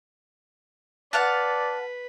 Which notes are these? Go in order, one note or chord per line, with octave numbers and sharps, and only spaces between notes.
B4 D5 F5 F#5 A5